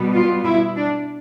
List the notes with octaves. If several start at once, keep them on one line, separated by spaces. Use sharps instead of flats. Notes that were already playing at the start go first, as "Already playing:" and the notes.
Already playing: B2 G3 B3
F4
E4
D4